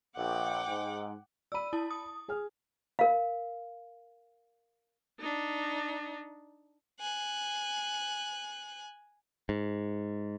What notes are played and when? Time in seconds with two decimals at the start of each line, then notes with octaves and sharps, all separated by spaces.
0.16 A#1 F#5 G5 D6
0.68 G#2
1.52 D5 B5 E6 D#7
1.73 E4 A5
1.91 D#6
2.28 G#4 G#5 F6
2.99 A#4 F5
5.19 D4 D#4
7.00 G#5 F#6
9.49 G#2